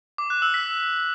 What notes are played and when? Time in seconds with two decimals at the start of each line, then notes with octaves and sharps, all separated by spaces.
0.18 D6
0.30 F#6
0.42 E6
0.54 B6